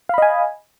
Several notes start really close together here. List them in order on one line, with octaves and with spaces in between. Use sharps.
F5 B5 D#5 G#5